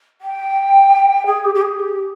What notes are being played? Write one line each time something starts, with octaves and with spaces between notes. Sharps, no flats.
G5
G#4
G4
G4
G#4
G4